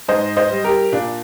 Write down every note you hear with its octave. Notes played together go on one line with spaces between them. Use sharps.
G#2 C5 D#5
C5 D#5
G3
G4 A#4
A#2 D4